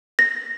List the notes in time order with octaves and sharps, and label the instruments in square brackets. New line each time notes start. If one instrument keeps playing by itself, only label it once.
[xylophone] A#6